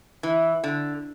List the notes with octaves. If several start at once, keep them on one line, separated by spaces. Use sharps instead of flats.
E3
D3